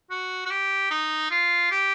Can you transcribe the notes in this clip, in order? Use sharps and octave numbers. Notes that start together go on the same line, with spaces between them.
F#4
F#4
G4
D#4
F4
G4